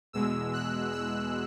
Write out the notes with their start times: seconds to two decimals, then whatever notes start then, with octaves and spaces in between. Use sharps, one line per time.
0.13 E2 B2 G#3 E6
0.53 F#6
0.92 E6